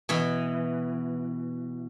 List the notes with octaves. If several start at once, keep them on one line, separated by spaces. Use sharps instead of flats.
B2 E3